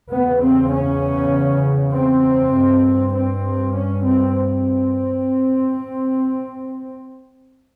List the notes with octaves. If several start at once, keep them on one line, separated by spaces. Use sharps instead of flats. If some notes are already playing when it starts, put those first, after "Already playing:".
E2 C#3 B3
C4
C#4
C4
G2
C4
C#4
C4
C4